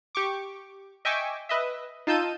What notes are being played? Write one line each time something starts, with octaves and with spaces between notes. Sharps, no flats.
G4 C#6 D6
D#5 E5 G5 G#5 C#6 D6
B4 D#5 E5
D#4 F4 A5 E6 G6 D#7